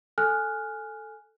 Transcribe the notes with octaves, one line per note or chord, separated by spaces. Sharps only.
A4 G#5 F6 F#6